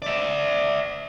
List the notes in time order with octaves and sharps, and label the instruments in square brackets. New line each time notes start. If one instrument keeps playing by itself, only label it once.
[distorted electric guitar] D5 E5